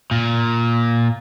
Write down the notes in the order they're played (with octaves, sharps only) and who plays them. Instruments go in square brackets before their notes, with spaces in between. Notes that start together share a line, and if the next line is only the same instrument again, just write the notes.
[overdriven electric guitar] A#2